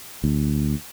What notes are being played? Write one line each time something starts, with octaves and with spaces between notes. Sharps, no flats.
D2